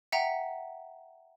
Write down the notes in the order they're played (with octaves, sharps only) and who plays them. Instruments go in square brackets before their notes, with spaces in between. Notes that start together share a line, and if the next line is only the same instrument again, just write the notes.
[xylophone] E5 F#5 G5 A#5